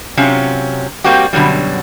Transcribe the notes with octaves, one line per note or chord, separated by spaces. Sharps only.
C3 F#3 C#4 F4
G3 A#3 C4 F#4 G4
F#2 B2 D3 F#3 G3